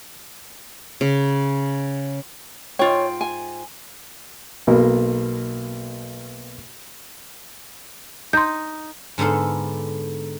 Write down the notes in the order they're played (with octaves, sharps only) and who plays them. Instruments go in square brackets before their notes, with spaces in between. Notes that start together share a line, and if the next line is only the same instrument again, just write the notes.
[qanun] C#3
[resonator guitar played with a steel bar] G#2 F4 G5 [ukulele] C#5
[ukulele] G#5
[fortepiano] B1 B2 A#3
[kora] D#4 [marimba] C6 G6
[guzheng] G#2 D3 B3 A4 F5